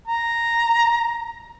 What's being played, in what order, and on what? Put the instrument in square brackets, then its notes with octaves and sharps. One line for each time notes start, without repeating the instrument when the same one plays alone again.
[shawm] A#5